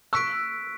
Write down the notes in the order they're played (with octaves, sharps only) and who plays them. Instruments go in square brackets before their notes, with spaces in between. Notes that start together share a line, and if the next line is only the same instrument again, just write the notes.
[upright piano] C#6 E6 [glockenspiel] F#6 B6 D7